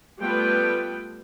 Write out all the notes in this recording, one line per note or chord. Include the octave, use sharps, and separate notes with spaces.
G3 A3 B3 F4 B4 G5